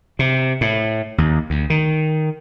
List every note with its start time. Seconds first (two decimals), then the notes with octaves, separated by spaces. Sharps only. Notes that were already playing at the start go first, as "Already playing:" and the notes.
0.19 C3
0.61 A2
1.18 D#2
1.50 D2
1.70 D#3